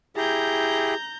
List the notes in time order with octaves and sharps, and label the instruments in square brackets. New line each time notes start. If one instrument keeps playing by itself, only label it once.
[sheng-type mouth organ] E4 G4 G#4 [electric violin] A#5 G6